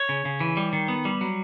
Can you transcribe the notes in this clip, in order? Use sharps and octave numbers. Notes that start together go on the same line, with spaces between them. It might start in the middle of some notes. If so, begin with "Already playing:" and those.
Already playing: C#5
C#3
C#3
E3
G3
D#3
B3
G3
F#3